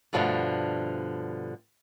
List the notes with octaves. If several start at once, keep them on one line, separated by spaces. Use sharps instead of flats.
G2 B2 D3 F3 G3 A3